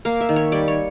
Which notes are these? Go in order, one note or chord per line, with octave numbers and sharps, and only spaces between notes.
A#3 F5
E5
D#3
C#5
G3 D5
C#5